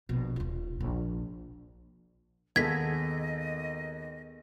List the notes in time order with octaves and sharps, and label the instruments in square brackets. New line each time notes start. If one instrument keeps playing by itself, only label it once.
[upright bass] A#1 B2
D#1 F4
A#1
[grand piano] D#2 [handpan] B3 G#4 A4 [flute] D#5 [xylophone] G#6 B6